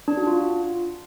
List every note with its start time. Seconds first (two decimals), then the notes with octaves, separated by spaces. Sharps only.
0.08 D4
0.17 F#4
0.27 F4